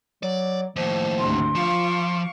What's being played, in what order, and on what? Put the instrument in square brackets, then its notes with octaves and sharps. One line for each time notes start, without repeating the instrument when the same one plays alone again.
[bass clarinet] F#3 [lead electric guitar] D5
[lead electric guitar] D#2 A2 [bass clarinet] F3
[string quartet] D2 G#2 C3 [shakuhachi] C6
[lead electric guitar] F3 [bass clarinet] F4 [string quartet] F5 C#6 D6